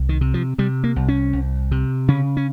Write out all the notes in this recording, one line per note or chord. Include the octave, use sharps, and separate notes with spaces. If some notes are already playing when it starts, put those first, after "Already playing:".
Already playing: C2
D#3
C3
F3
C3 G3
A#3
C2
C#4
C2
C3
C#3 C#4
C#4